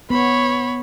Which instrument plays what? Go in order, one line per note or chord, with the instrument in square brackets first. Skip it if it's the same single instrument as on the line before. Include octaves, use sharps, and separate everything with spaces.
[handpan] B3 [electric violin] C#5 B5